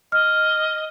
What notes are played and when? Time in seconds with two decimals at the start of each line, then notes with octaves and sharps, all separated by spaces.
0.12 D#5 F6